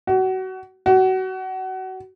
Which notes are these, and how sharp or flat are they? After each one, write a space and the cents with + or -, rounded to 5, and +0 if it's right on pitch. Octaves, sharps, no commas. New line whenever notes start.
F#4 +25
F#4 +25